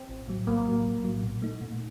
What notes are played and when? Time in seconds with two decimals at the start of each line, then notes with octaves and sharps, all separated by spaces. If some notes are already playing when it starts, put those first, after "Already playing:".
Already playing: C4
0.09 A1
0.28 A2 F#3
0.47 A#1 A#3
0.66 A2 F#3
0.85 A#1
1.04 A2 F#3
1.23 A#2
1.42 A3 D#4
1.61 A#2